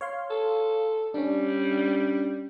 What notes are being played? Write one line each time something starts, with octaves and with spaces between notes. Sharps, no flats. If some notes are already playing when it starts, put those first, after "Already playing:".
C#5 F5 C6
A4
G3 C#4 D4